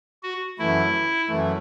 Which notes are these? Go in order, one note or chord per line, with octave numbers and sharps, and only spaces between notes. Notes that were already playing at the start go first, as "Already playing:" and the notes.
F#4
F#2 E3 A3 E4
F#2 E3 A3